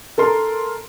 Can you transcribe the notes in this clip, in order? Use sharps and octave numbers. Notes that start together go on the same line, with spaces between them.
A4 A#4 C6